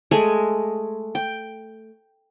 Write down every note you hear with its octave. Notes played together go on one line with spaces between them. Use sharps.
G#3 A3 G#5
G5